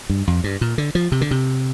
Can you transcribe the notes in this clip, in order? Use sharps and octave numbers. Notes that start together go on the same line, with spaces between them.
G2
F2
G2
A#2
D3
F3
C3
D3
C3